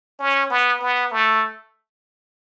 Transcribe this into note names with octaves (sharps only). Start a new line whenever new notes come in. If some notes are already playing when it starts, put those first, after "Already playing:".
C#4
B3
B3
A3